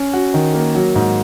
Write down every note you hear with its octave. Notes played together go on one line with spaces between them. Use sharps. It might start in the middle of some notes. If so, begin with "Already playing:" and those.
Already playing: C#4
F#4
D#3
A#3
F#3
G#2